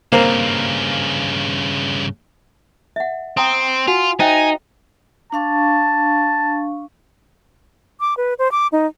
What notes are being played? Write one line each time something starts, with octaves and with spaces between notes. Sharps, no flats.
G2 C#3 A#3 C4 A#4
E5 F#5
C4 G5 A#5 D#6
F4 F#4 F#5 G#5
D#4 C5 E5 G5 G#5
D4 F5 A5 C#6
D6
B4
C5
D6
D#4